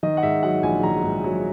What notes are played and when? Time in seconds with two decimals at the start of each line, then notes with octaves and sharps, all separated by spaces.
0.03 D#3 D#5
0.17 F#5
0.23 G#2 E5
0.43 F#3 F#5
0.63 A#1 G#5
0.83 D#3 A#5
1.04 G#2
1.24 F#3